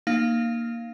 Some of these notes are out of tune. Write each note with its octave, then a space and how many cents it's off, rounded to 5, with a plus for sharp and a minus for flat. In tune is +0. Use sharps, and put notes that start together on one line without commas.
A#3 +0 D#4 -30 F5 +0